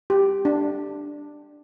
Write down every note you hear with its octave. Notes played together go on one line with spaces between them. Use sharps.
G4
D4